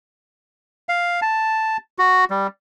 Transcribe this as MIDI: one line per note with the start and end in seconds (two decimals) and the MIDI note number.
0.89 1.20 77
1.22 1.77 81
1.99 2.25 66
2.30 2.47 55